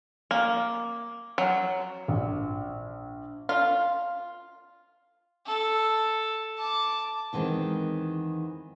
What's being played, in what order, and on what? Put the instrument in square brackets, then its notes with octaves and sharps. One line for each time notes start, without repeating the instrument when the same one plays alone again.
[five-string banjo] A#3
F#3
[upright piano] A#1
[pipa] F4
[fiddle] A4
A5 D6
[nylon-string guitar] E2 D#3 E3 G#3 C4